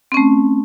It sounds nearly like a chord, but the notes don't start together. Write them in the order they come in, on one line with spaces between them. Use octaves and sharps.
C4 C#4 A3